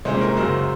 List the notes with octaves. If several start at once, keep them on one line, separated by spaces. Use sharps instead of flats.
C2 A#2 G#3 C#4 C5
A#4
F#2 C#3 F#3 C5